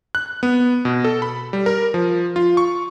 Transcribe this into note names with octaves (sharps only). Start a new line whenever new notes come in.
F#6
B3
B2
A4
B5
G3
A#4
F3
F4
C#6